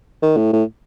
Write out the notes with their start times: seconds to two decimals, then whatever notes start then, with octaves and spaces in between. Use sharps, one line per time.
0.22 D#3
0.37 A2
0.53 A2